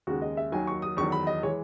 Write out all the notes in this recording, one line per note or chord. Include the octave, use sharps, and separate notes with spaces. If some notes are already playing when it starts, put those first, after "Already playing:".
D#2 C#3 G#3 F#4
D#5
E5
D#2 D#3 F#3 G#5
C#6
D#6
E2 D#3 F#3 C#6
B5
D#5
E3 G#3 C#5